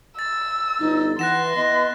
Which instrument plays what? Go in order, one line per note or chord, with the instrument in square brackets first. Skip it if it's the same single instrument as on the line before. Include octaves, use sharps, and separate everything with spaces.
[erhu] E6 [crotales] A6
[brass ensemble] G1 [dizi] D#4
[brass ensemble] E3 [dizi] F#5 [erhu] C6 [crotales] F#6 A#6 E7
[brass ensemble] B3 E4 [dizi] D#5